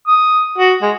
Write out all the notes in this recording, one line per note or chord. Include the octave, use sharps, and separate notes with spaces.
D#6
F#4
G#3